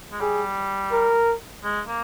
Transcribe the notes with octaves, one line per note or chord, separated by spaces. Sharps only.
G#3
G3 G#4
A#4
G#3
A#3